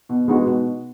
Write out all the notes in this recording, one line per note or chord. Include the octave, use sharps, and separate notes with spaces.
B2
G#3 B3 D#4 F#4
B2